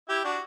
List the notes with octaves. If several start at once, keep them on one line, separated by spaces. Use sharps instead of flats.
E4 G4
D4 F#4